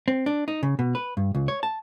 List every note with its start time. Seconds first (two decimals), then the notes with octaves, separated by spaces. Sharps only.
0.08 C4
0.26 D4
0.48 D#4
0.63 C#3
0.79 B2
0.95 B4
1.17 G2
1.35 C#2
1.48 C#5
1.63 A5